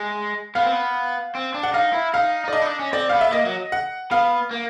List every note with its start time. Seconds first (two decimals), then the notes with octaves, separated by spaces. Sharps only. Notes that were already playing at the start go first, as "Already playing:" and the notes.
Already playing: G#3
0.55 B3 F5
0.63 C4
0.72 B3
1.35 C4
1.54 D4
1.63 F#5
1.73 D#4 F5
1.93 E4
2.14 D#4 F5
2.44 D#4 D5
2.53 D4 D#5
2.61 D#4
2.66 D4
2.79 C#4
2.93 C4 D5
3.09 B3 F5
3.21 E5
3.32 A#3 D#5
3.46 F#3
3.72 F#5
4.11 B3 F5
4.51 A#3